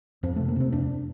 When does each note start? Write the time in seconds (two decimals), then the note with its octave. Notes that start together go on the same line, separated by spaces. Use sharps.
0.23 F2 C4
0.36 C3 A3
0.48 A#3
0.56 C3 C4
0.72 F2 D4